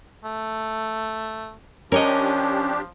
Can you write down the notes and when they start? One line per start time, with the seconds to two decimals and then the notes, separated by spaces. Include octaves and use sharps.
0.24 A3
1.92 F3 C#4 D4 G4 A#4 C#5 D#5